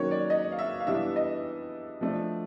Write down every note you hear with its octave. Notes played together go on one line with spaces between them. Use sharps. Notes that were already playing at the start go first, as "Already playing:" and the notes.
Already playing: D#3 F#3 A#3 C#4 C#5
D5
D#5
F5
E5
F5
E3 G3 B3 D4 E5
D#5
F3 A3 D4